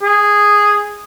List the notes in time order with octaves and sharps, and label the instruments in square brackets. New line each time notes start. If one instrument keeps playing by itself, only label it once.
[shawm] G#4